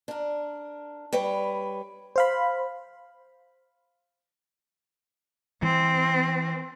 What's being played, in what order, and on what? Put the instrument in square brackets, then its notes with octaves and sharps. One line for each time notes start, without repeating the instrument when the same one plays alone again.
[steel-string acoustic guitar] D4 A#4
G3 B4 C#5
[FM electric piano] C5 F5 B5
[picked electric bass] E3 [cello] C4